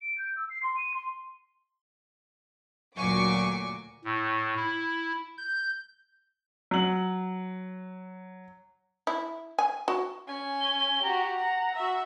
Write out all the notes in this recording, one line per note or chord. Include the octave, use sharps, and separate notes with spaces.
D7
G6
E6
C7
C6
D#7
C6
D2 A#2 F#3 G#5 C#6 D6
A2
E4
G6
F#3 F#7
E4
G#5
F#4
C#4 G#5
G7
F#4 G4 A#5
F#5
F#4 E5